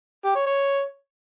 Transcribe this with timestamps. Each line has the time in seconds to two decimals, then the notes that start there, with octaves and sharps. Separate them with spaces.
0.25 G4
0.36 C#5
0.46 C#5